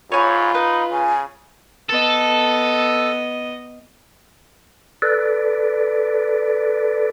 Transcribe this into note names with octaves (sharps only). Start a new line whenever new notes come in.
G#2 F4 C#5 G#5 B5
D#4 B4
C#3 G#5
B3 A4 D#5
A4 B4 D5